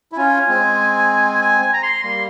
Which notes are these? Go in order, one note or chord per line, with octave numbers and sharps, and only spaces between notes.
E4
C#4 F4 G#5
G#3 C4
G#5
G#5
A#5
C6
G3 A#3 C6